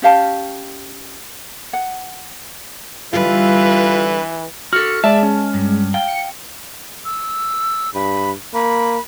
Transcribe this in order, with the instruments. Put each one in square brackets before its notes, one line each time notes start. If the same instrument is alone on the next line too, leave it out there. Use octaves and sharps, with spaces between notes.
[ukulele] C#4 G4 F5 A5
F#5
[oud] D3 G3 [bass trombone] E3 [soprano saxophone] F4 [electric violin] B4
[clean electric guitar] F#4 A4 [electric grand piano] F6 [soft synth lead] C#7
[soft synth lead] G#3 [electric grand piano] D5 E5 [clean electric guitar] A5
[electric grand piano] C#4
[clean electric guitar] G2
[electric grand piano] F5 [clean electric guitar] G5
[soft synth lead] C#7
[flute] E6
[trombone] G2 [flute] B5
[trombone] A#3 [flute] B5